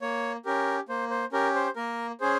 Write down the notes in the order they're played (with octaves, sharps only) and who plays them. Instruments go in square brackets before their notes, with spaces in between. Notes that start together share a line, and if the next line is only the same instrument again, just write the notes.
[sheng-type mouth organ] A#3 C#5
C#4 G4 A#4
A#3 C5
C5
C#4 G4 A#4
C5
A#3 A#4
C#4 G#4 C5